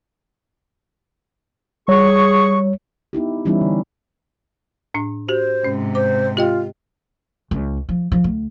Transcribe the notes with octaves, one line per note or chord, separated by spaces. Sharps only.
G3 G#4 C#5 C#6
B3 D#4 E4 G4
E3 G3 B3 C#4 D#4 E4
D3
A2 D4
F#4 G4 C5
G#2 C3 C#4
C5 D6
F4 G4 D#5 G5
C#2
F3
F3
D2